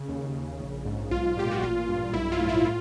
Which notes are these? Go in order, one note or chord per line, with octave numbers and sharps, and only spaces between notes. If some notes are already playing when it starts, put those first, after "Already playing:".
Already playing: C#3
D#2
C#3
A#1
G#2
B1 F4
A#2 G4
F#4
A1 F4
G2
B1 E4
F4
A2
E4
F4